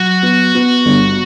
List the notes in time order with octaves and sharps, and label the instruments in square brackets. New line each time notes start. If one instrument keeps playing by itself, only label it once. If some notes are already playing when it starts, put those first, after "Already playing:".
Already playing: [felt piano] F#3 [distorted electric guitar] F#4
[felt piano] B3
B3
G1